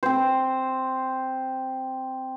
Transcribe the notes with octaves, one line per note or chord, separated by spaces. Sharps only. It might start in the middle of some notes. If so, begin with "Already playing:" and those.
C4 C5